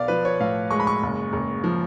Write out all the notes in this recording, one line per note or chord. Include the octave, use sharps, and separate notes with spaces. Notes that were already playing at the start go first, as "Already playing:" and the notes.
Already playing: B1 B3 D5 F5
F3 B4
C#5
A2 F5
G#3 C#6
B5
C#6
F#1
F#1
F3